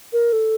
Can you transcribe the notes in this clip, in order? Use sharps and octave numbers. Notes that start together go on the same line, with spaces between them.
A#4
A4